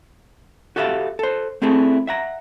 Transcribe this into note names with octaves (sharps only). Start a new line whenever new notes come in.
F#4 G4 A4 E5 F5
A4 C5
A3 C4 E4 G#4 A4
E5 F#5 A#5